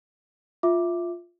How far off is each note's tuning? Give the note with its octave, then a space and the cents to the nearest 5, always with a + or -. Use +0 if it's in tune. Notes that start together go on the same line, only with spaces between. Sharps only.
F4 +0 E5 +0 D6 +0